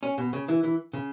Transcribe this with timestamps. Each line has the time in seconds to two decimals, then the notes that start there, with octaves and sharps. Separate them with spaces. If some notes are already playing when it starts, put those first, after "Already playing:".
0.03 C#4
0.18 B2
0.33 C#3
0.48 E3
0.63 E3
0.93 C#3